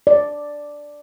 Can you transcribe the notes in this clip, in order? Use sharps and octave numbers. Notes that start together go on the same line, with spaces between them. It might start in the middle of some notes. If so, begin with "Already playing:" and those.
D5